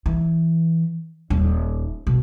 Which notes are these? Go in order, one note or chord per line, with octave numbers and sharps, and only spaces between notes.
E3
D#1
B2